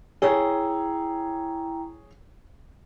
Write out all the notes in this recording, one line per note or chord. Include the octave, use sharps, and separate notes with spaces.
E4 G#4 C#5 G5 A#5